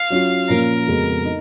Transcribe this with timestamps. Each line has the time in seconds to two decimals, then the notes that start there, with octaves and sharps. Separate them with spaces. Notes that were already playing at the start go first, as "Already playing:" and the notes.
Already playing: F5
0.10 F#3 C#4 F4
0.48 A#2 F3 A#3 C#4 F4 A#4
0.87 F2 C#3 G#3 B3 F#4
1.25 D#4